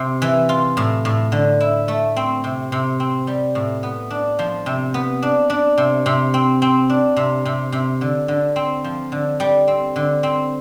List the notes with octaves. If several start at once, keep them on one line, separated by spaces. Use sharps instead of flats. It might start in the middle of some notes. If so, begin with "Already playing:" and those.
Already playing: C3
E3
F4
A2
A2
D3
E4
A3
C4
C3
C3
C4
G3
A2
B3
D4
F3
C3
B3
D4
D4
C3
C3
C4
C4
D4
C3
C3
C3
D3
D3
C4
F3
D3
G3
C4
D3
C4